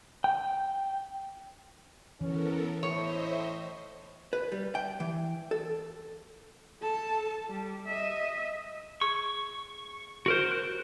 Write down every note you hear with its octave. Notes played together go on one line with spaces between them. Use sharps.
G5
E3 B3 C#4 A4 A#4
A2 C5 C#5 D#5 E5
B4
G3
G5
E3
A4
A4 A5
G3
D#5 E5
G#4 C#6
F#4 A#4 C5
F#6